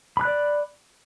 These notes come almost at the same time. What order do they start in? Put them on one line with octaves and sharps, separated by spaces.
B5 F#6 D5